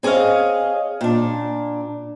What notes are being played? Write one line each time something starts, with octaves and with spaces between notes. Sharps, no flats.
C4 G#4 C#5 D#5 F5
A#2 D4